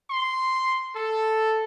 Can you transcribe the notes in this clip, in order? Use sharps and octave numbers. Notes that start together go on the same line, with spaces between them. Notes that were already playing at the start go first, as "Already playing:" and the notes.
C6
A4